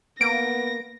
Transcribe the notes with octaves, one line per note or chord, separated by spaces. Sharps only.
A#3 B3 A#6 D7